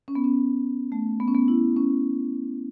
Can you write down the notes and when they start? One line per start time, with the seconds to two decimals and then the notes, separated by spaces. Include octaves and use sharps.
0.08 C#4
0.15 B3
0.24 C#4
0.92 A3
1.20 B3
1.28 C#4
1.35 B3
1.48 E4
1.77 C#4